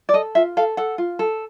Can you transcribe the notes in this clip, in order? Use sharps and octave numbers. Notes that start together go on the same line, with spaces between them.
D5
A4 D#5
F4 E5
A4 F5
A4 F#5
F4
A4